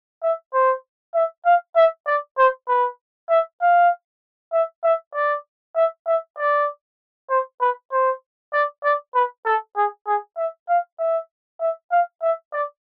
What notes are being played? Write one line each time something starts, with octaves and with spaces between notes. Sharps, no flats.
E5
C5
E5
F5
E5
D5
C5
B4
E5
F5
E5
E5
D5
E5
E5
D5
C5
B4
C5
D5
D5
B4
A4
G#4
G#4
E5
F5
E5
E5
F5
E5
D5